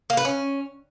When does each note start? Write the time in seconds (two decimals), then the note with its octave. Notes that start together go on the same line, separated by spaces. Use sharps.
0.10 A#3
0.17 B4
0.25 C#4